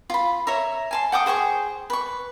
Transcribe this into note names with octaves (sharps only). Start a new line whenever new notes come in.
F4 B5
C#5 E5 A#5
G#5 A5 C6
F#5 G5 D6 D#6
G#4 C5 G5 C#6
B4 C#6